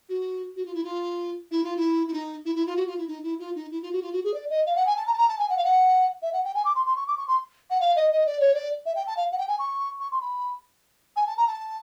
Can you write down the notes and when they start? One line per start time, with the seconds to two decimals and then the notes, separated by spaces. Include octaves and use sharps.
0.09 F#4
0.56 F#4
0.65 F4
0.74 E4
0.84 F4
1.51 E4
1.64 F4
1.77 E4
2.08 E4
2.13 D#4
2.46 E4
2.56 E4
2.67 F4
2.77 F#4
2.87 F4
2.98 E4
3.08 D#4
3.23 E4
3.39 F4
3.56 D#4
3.71 E4
3.82 F4
3.93 F#4
4.02 F4
4.13 F#4
4.24 G#4
4.34 D5
4.50 D#5
4.66 F5
4.76 F#5
4.86 G#5
4.97 A5
5.07 A#5
5.13 A5
5.18 A#5
5.29 A5
5.39 G#5
5.49 F#5
5.57 F5
5.64 F#5
6.22 E5
6.33 F#5
6.45 G5
6.55 G#5
6.65 D6
6.75 C6
6.86 C6
6.96 C#6
7.08 D6
7.18 C#6
7.28 C6
7.70 F#5
7.80 F5
7.96 D#5
8.12 D#5
8.26 D5
8.40 C#5
8.54 D5
8.86 E5
8.95 G5
9.07 A5
9.17 F5
9.32 F#5
9.38 G5
9.48 G#5
9.59 C#6
10.00 C#6
10.12 C6
10.21 B5
11.16 G#5
11.27 A5
11.37 A#5
11.48 A5